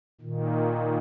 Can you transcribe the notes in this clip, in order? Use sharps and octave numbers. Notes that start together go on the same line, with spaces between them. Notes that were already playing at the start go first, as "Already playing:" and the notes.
A#2 D#3